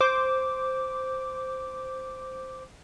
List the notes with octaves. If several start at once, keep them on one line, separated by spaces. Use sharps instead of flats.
C5 D6